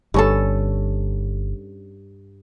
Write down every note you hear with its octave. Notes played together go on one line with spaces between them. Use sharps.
G1 G2 C#4 A4